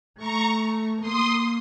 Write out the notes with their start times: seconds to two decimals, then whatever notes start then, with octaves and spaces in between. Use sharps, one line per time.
0.17 A3 A#5 C#6
1.00 A#3 C6 D#6